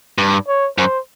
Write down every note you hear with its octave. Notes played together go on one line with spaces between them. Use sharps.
G2
C#5
F#2 C5